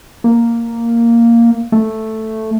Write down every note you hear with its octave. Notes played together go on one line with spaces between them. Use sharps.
A#3
A3